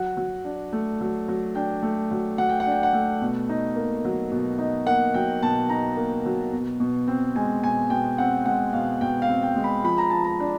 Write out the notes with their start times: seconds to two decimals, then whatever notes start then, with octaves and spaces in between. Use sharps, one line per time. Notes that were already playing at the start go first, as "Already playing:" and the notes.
Already playing: F#3 F#5
0.17 F#3
0.45 D4
0.73 A3
1.01 F#3
1.28 F#3
1.55 D4 G5
1.83 A3
2.11 F#3
2.38 F#3 F#5
2.49 G5
2.60 F#5
2.66 D4
2.72 G5
2.83 F#5
2.93 A3
3.22 B2
3.49 D#4
3.76 A#3
4.05 F#3
4.32 B2
4.59 D#4
4.86 A#3 F#5
5.14 F#3 G5
5.42 B2 A5
5.69 D#4 A#5
5.97 A#3
6.26 F#3
6.53 B2
6.80 B2
7.08 C4
7.36 G#3 G#5
7.64 B2 G#5
7.90 B2 G5
8.18 C4 F#5
8.46 G#3 F#5
8.73 B2 F5
9.01 B2 G5
9.22 F5
9.29 C4
9.42 G5
9.56 G#3
9.64 B5
9.84 F3 B5
9.98 A#5
10.10 F3 A5
10.24 A#5
10.40 D4